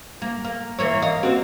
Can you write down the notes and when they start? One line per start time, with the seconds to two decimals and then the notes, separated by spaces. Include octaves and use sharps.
0.22 A#3
0.45 A#3
0.79 E3 A#3 C#5
1.02 D#5 F5
1.23 A#3 C4 F#4